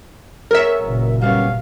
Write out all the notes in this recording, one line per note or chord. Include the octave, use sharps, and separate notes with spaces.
B3 G#4 A#4 C#5 E5
F#1 A#2
G3 B3 C#4 F5